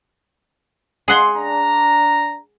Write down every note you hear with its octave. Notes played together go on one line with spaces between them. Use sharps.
G#4 F#5 C6
D4 A#5